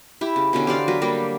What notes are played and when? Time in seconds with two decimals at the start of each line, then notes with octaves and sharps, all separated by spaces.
0.21 E4 G4
0.36 C#3
0.53 B2 D3 C#4
0.67 G4 C5 D5 F5
0.88 F#3 B4
1.01 F#3 G3 A#3 G4